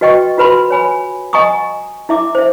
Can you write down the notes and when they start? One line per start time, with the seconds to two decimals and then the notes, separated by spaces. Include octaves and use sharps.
0.01 F#4 B4 D#5 G5 C#6
0.37 F4 F#4 B4 B5 C6
0.70 C#5 G#5 B5
1.33 D#5 F#5 G#5 A#5 C#6 D#6
2.09 E4 E5 D6
2.35 C5 E5